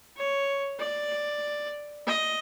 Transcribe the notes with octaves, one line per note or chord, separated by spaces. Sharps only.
C#5
D5
D#5